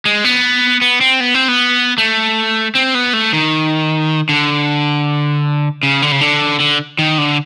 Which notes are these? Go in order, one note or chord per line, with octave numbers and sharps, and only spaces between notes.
G#3
B3
B3
C4
B3
C4
B3
A3
C4
B3
A3
D#3
D3
C#3
D3
C#3
D3
D3
D#3
D3